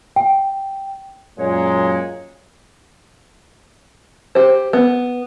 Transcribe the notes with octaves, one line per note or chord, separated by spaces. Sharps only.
G5
F#2 A#2 G#3 C#5
G4 C5
B3